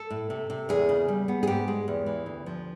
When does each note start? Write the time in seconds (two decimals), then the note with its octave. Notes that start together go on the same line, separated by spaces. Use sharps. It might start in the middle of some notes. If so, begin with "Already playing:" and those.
Already playing: A4
0.10 A2
0.30 C3
0.50 C3
0.69 E2 G#4
0.89 C#3
1.08 G3
1.28 B3
1.43 G#4
1.47 G#2 G4
1.68 G#3
1.88 E2
2.06 E3
2.26 D2
2.46 F3